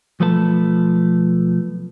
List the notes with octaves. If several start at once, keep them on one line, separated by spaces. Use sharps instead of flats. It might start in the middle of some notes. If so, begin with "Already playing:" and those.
B1 F3 A3 B4 E5 A5